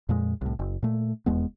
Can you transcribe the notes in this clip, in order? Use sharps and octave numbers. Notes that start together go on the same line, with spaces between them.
F2 A#2 G#3
C2 A2
F#1
A#2 A3
F1 E2 G#3 B3